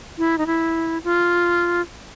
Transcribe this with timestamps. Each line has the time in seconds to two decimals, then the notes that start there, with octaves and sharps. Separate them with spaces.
0.18 E4
0.38 D#4
0.47 E4
1.04 F4